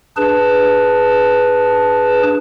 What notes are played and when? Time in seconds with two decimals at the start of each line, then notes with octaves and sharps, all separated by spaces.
0.17 D4 G#4 B4 A5